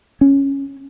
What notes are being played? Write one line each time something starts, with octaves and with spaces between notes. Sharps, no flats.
C#4